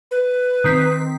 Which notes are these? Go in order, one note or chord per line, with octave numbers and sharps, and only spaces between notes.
B4
D#3 C4 B6